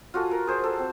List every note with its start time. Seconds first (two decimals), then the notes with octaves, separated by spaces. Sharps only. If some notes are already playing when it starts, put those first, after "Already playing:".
0.14 F4 F#4 A4 G#5
0.31 A#4
0.47 G#4 C5 D5
0.64 A4
0.79 C4